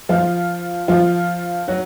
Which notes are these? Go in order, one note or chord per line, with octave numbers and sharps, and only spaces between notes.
F3 F4
F3 F4
F#3 F#4